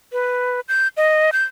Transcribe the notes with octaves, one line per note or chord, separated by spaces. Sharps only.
B4
G6
D#5
G6